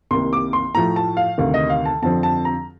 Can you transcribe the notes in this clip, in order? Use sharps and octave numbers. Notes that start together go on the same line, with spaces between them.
C2 C3 D#3 A#3 C6
D6
C6
A2 F3 A3 A#5
A5
F5
D2 C3 D#3 F5
D#5
F5
A5
F2 D3 F3 C4 A5
A5
A#5